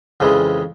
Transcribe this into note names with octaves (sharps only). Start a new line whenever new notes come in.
F2 C#3 E3 G#3